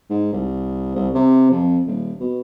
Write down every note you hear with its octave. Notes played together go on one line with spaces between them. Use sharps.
G#2
C2
C2
C3
F2
D#1
B2